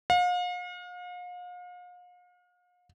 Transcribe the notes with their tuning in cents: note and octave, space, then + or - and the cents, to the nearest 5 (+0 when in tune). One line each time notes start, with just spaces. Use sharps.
F5 +40